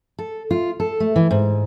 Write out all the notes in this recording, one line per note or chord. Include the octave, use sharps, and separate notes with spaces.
A4
F4
A4
A3
E3
G#2